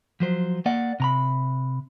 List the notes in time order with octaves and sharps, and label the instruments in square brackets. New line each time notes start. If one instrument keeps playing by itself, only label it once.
[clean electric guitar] F3 F#3 C5
A#3 D5 F#5
C3 A#5 B5